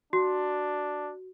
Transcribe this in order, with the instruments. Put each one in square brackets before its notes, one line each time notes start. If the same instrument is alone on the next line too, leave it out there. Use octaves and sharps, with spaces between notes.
[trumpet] D4 [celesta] F#4